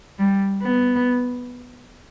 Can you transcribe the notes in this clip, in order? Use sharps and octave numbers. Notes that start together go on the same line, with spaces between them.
G3
B3